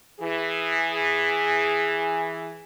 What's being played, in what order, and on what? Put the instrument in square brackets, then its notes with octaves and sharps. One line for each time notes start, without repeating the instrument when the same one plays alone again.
[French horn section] E3 G#4